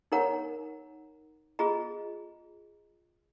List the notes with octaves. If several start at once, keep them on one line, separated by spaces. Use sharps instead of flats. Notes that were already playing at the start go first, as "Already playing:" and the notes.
D#4 A#4 C#5 F#5 A#5
F4 G#4 D#5 A#5